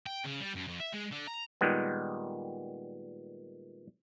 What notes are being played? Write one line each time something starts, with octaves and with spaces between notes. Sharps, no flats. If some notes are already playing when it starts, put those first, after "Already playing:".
G5
C#3
G3
F#2
F2
E5
G#3
D3
A#5
A#2 D#3 G3 G#3 B3